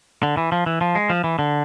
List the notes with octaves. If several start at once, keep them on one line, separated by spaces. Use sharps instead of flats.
D3
E3
F3
E3
F3
G#3
F3
E3
D3